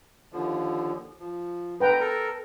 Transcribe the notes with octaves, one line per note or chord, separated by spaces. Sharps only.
D#2 D3 F3
F3
D3 B4 G5 A#5
A4 A#4